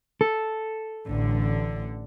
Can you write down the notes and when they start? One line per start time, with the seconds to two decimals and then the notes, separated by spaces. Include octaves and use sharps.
0.21 A4
1.07 A1 D3